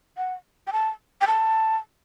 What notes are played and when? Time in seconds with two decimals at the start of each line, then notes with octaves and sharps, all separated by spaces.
0.17 F#5
0.67 G5
0.72 A5
1.21 G5
1.27 A5